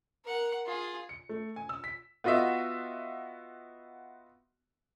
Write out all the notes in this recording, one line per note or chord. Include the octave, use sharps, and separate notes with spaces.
A#4 F#5
F4 G#4
C#7
A3
G#5
E6
B6
B3 F4 F#4 D#5 E5